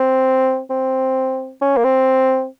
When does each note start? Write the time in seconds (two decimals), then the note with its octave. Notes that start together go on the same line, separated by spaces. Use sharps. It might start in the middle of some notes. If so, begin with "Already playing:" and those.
Already playing: C4
0.70 C4
1.61 C#4
1.77 A#3
1.84 C4